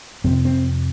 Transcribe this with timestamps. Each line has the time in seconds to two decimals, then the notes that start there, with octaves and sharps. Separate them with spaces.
0.24 F2 C3 C4
0.45 C4